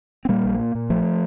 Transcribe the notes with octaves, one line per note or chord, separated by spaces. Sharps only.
C4
A#2 G3 A#3
A#1
A#2
A#2
A#1 F3 A3